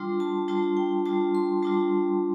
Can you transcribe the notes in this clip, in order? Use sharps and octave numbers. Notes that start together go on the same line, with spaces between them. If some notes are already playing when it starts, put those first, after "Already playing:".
Already playing: G3 D4 F4 C6
A5
G3 D4 F4 A5
G5
G3 D4 F4 A5
C6
G3 D4 F4 A5